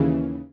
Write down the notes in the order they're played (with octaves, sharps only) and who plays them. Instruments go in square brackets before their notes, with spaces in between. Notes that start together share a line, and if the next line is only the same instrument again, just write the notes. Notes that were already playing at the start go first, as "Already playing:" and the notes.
Already playing: [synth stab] D#2 C#3 E3